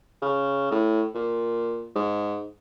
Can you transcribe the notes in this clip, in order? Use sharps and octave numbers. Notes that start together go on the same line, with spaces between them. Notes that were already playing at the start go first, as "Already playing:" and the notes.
C#3
A2
A#2
G#2